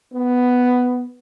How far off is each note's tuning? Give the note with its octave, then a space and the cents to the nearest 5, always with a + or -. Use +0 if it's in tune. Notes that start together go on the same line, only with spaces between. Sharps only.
B3 +5